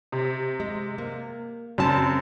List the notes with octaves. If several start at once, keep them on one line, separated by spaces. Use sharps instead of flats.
C3
G#3
A#3
F#2 C#3 C4 A5